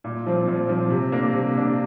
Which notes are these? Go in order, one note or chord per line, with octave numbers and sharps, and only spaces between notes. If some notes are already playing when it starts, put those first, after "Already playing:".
A#2
F3 C4
A#2
F3 C4
C3
A#3 D4
C3
A#3 D4